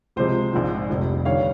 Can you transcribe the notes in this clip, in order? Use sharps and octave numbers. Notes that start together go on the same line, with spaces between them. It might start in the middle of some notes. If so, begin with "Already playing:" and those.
C#2 C3 F3 G#3 C5
A#1 G#2 F3
F1 F2 C3 G3
G1 G2 D#3 G3 C#5 F5